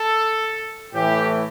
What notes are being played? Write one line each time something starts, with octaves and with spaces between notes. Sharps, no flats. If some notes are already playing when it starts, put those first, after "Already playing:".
Already playing: A4
A2 E3 A3 G4